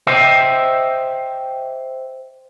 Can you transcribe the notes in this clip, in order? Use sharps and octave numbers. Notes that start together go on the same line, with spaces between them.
C5 D#5 E5 G5